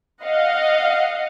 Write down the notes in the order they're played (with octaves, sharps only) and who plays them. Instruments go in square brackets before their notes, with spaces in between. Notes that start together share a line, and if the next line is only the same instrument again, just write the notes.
[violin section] D#5 F5 F#5